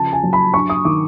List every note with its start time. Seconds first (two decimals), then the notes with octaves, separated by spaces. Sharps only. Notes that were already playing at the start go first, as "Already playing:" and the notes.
Already playing: C#3 F3 A5
0.13 G#5
0.23 F#3
0.33 B5
0.54 G2 C#6
0.70 D#6
0.85 D#3 D6